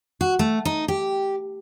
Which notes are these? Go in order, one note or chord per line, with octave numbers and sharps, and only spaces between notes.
F#4
A3
D#4
G4